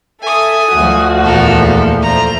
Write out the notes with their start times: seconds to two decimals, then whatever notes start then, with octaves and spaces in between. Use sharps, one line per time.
0.22 A4 E5 G#5 D#6
0.72 D2 F3 F#4
1.24 E2 A#2 A4 A#4
2.02 A3 C5 A#5